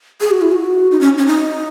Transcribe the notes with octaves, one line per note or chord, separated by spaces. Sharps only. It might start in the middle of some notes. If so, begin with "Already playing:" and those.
G#4
F#4
E4
F#4
D#4
C#4
C#4
D#4